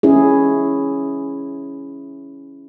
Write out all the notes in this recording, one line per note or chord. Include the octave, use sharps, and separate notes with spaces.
C#4 E4 G#4